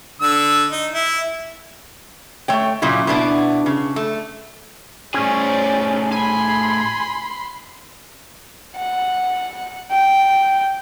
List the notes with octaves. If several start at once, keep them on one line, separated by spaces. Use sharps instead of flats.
D3 E6
D#4
E4
A3 C#5 G5
A#2 C#3 F#3 E4
B2 B3 D4 E4
C#3
A3
A2 C#4 G#4 C5 D5
G#5 B5 C6
F#5
G5